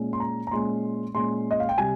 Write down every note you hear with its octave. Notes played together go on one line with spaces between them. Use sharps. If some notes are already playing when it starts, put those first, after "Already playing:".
Already playing: A#2 G#3 C#4
C6
A#5
A#5
A#2 G#3 C#4 C6
A#2 G#3 C#4 C6
D#5
F5
G5
C3 G3 G#5